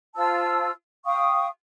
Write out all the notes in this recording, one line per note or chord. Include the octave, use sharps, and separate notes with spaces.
F4 C5 A5 E6
F5 G5 C#6 D#6